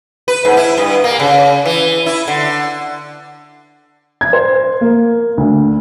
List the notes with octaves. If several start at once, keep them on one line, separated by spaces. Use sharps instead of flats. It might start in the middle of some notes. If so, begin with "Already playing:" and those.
B4
G#2
E4
G2
A#3
C#3
E3
E4
D3
G#6
C5
A#3
D2